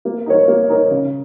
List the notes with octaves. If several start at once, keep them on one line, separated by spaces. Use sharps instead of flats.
A#3
D#4 A#4 C#5
A#3
D#4 A#4 C#5
C#3